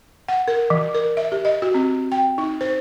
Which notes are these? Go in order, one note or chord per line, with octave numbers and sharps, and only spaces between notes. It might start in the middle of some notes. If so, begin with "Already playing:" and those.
F#5
A#4
E3
A#4
E5
G4
D#5
F#4
C4
G5
D#4
C5